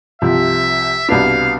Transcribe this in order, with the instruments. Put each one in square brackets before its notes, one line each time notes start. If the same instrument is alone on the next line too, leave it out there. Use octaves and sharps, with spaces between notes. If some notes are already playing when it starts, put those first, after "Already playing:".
[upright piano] C2 C3 F3 [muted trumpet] E5
[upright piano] C2 B2 B3 D4 [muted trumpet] F5